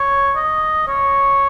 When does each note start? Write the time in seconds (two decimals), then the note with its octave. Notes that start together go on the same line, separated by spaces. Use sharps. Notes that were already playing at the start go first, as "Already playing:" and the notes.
Already playing: C#5
0.36 D#5
0.88 C#5